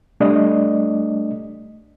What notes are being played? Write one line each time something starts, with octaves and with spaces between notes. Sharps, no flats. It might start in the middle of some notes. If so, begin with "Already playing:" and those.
G3 A3 D4 D5 D#5